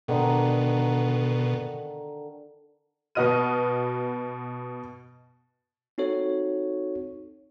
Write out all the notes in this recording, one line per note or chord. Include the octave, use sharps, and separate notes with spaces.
B2 D3 D#3
B2 B3 F#4 D#5 F6 D#7
C4 D#4 F#4 A4 C#5